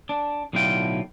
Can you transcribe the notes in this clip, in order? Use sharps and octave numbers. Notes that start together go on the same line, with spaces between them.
D4
B1 A2 D3 F4 G5